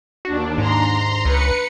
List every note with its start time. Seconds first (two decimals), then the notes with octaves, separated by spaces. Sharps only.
0.25 D#2 D4 F#4
0.58 G#2 A#5 C6
1.25 C#2 B4 C#7